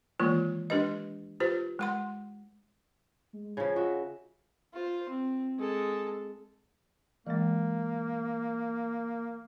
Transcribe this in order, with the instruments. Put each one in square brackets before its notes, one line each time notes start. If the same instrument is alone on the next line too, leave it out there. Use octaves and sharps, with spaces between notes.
[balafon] D#3 E3 G#3 A#3 F4
G#3 D4 G4 B4 D#5
F4 G4 B4 C5
G#3 F#5 C6
[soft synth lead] G#3
[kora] C#3 F3 [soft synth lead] G#6
[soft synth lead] F4 [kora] F#4 D#5 E5
[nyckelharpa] F4 C5
C4
G#3 A4
[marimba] E3 G#3 [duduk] A#3